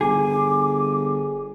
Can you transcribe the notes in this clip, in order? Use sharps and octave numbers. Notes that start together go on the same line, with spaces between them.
G1 G#4 D6